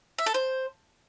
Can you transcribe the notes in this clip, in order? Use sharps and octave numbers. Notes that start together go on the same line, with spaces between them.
E5
A4
C5